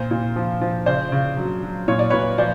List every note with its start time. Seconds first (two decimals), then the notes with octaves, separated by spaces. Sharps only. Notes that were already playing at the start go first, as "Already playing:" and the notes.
Already playing: A#2 C5
0.11 A#2
0.36 F3
0.61 F3
0.86 C#3 C5 D5
1.12 C#3
1.37 F#3
1.63 F#3
1.88 A#2 C#5
1.99 D5
2.10 A#2 B4 C#5
2.38 F3 C5 D5